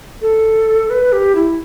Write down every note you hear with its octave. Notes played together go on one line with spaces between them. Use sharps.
A4
B4
G4
E4